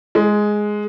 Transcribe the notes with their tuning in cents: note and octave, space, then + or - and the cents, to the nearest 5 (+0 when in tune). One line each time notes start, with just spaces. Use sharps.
G#3 +5